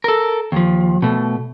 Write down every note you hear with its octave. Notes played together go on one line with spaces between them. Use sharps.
A4 A#4
D#2 F3
B2 A3